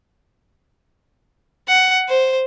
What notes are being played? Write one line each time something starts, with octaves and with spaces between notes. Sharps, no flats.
F#5
C5